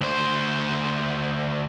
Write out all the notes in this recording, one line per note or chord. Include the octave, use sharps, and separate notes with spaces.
D2 C5